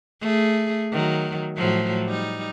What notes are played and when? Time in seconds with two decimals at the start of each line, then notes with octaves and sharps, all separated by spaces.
0.21 A3 G#4
0.92 D#3 F#3
1.57 A2 F3 F#3
2.06 G3 D#4